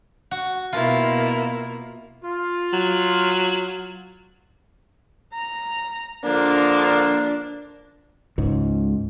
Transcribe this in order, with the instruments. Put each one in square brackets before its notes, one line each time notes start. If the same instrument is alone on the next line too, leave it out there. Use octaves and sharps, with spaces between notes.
[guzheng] F#4
[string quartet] B2 A#3 E4 [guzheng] F4
[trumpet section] F4
[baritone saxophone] F#3
[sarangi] A#5
[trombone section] D3 F3 A#3 [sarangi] D4
[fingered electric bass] C#2 G#2